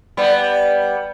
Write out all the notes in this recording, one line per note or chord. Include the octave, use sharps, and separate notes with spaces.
G3 B3